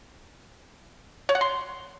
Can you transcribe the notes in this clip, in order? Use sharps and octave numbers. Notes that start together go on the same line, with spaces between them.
C#5
F#5
C6